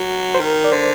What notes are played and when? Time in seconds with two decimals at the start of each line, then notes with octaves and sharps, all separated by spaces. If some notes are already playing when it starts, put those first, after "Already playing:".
Already playing: F#3 F#4
0.35 C5
0.39 D#3 A#4
0.64 D5
0.72 D3 C5